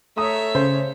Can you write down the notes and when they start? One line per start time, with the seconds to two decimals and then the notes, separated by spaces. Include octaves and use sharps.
0.17 A3 C#5 E5 A#5 D#6
0.55 C#3 C5